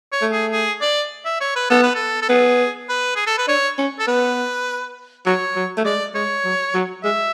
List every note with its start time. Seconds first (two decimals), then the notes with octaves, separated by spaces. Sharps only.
0.12 C#5
0.22 A3
0.32 G#4
0.51 G#4
0.81 D5
1.25 E5
1.40 C#5
1.56 B4
1.70 B3 A4
1.82 B4
1.94 A4
2.22 A4
2.29 B3 G#4
2.89 B4
3.16 G#4
3.26 A4
3.38 B4
3.47 D4 C#5
3.78 C#4
3.99 A4
4.07 B3 B4
5.26 F#3 C#5
5.56 F#3
5.77 A3
5.85 G#3 D5
6.15 G#3 C#5
6.45 F#3
6.74 F#3
7.03 G#3 E5